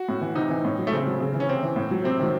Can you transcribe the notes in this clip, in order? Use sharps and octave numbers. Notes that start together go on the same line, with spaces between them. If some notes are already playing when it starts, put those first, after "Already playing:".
Already playing: F#4
A2
E3
C3 D#4
E3
A2
F#3
A3
C#3 C4
F#3
C#3
E3
C#4
C3 C4
E3
A2
F#3
C3 C4
D#3 F#3